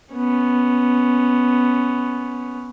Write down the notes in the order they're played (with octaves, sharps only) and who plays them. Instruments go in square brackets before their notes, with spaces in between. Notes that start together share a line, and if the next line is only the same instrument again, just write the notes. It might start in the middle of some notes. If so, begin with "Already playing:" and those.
[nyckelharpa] B3 C#4